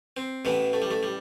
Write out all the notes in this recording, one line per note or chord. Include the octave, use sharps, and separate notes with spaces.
C4
A1 A2 E3 B3
A3
G3
A3
G3